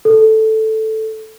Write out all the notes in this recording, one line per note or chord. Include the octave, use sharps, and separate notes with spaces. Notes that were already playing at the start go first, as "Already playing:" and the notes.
A4